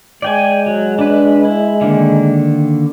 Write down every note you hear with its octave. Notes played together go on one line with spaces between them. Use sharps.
G#3 D5 G5 G#5
F#3
D4 B4
E4
D3 D#3 A#3